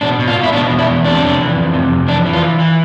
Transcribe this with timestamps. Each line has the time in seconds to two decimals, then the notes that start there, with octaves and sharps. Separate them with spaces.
0.01 B2 D4
0.19 B2
0.28 F4
0.35 B2
0.43 E4
0.53 B2 D4
0.71 E2
0.79 E4
0.88 E2
1.04 C3 D4
1.22 F2
1.40 E3
1.56 F2
1.74 C3
1.91 F2
2.08 E3 D4
2.26 E3
2.33 F4
2.43 E3
2.59 E3